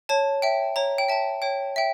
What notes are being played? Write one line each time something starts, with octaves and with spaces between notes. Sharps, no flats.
C#5 A5
E5 G5
C#5 A#5
G5
E5 G5 A5
C#5 G5
E5 G5